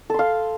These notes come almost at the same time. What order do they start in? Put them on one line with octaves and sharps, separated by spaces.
A4 C6 F5